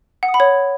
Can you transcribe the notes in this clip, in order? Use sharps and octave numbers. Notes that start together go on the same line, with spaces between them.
F#5
D#6
B5
C#5